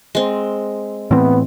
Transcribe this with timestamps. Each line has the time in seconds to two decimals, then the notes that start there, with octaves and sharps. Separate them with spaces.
0.15 G#3 C4
1.11 A2 E3 B3 C4